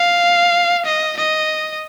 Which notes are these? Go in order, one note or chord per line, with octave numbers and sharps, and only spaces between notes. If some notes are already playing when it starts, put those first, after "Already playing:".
Already playing: F5
D#5
D#5